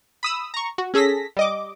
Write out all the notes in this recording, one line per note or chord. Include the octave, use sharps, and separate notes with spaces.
B5 D#6 E6
A#5 C#6
F#4
C#4 G#4 A4 A#6 B6
G3 D#5 D6